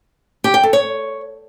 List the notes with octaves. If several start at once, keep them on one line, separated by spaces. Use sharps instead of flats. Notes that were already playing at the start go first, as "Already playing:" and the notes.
G4
G5
A4
C#5